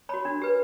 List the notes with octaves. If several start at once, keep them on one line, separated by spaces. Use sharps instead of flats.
F#4 C#5 B5
D4
G4 B4